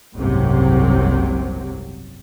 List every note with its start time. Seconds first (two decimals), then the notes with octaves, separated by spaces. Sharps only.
0.15 F#1 C2 G#2 C3 F#3 C4